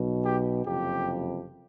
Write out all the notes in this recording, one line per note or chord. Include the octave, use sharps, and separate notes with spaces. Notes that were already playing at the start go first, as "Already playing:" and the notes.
Already playing: B1 B2
G4
F#1 F2 C3 G4